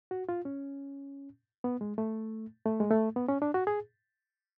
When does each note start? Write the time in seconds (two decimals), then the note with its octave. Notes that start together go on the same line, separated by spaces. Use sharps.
0.11 F#4
0.29 F4
0.45 C#4
1.64 B3
1.81 G#3
1.98 A3
2.65 A3
2.80 G#3
2.91 A3
3.16 B3
3.28 C#4
3.42 D4
3.54 F#4
3.67 G#4